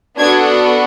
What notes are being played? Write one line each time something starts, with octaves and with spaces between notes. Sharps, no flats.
B3 D4 F#4 A4 G#6